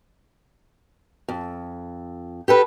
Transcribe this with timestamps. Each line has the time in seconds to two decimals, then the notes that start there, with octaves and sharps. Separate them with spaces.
1.28 F2
2.48 G4 A4 B4